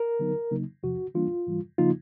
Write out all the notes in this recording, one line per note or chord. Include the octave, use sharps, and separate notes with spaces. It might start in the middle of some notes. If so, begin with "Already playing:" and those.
Already playing: A#4
D3 F#3 B3 D#4
C#3 F#3 A#3 D#4
E2 C3 F3 F#4
E3 G3 A#3 D4 F4
G#2 E3 G3
C#3 F3 A#3 D#4 F4